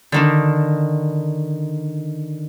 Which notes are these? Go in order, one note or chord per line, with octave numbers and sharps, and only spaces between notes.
D3 D#3 D4